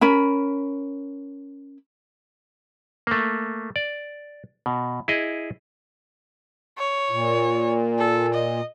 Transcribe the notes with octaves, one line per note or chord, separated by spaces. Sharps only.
C#4 A#4 B5
A3 A#3
D5
B2
E4 G#4 D#5
C#5
A#2
A4
D#5